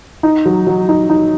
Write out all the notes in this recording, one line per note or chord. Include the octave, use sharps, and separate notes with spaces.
D#4
F#3
F#3
D#4
D#4